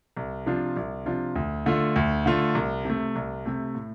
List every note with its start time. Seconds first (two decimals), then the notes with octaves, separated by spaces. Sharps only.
0.17 C2
0.46 C3 F3 D4 F4
0.76 C2
1.06 C3 F3 D4 F4
1.35 D2
1.66 D3 A3 F4
1.96 D2
2.26 D3 A3 F4
2.55 C2
2.85 C3 A3
3.16 C2
3.46 C3 A3
3.75 A2